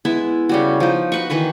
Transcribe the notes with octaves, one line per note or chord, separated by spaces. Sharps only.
G#3 B3 E4 E5
C#3 G3 F#4
F3 D#4
F#4 B4 C#6
D#3 E3 B4 C#6